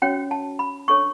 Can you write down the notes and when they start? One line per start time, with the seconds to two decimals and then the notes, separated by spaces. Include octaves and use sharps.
0.02 C#4 F#4 C#5 G5
0.31 A5
0.59 B5
0.88 D4 A4 C#5 C#6